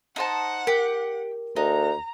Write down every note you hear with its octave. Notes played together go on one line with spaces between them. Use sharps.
D#4 C5 F#5 A5
G4 A#4
D2 D#4 A#5